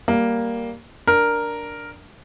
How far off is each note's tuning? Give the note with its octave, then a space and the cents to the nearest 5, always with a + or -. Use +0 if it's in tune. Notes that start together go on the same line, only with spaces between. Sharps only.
G3 +0 A#3 +0
D4 +0 A#4 +0